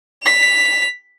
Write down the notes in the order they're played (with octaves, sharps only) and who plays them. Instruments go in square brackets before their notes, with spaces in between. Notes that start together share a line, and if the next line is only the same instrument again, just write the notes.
[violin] B6 F7